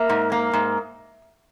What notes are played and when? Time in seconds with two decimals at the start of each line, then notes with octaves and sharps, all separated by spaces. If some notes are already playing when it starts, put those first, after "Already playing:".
Already playing: A#3 E5
0.10 G#2
0.32 A#3
0.53 G#2